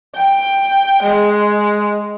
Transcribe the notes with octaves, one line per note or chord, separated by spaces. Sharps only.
G5
G#3